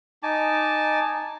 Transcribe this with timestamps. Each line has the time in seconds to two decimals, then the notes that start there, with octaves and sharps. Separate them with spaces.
0.23 D#4 G#5 A5 D6